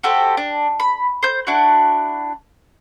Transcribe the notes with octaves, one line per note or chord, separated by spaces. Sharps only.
F#4 G4 A4 C5
D4
B5
C5 G6
D4 E4 F#4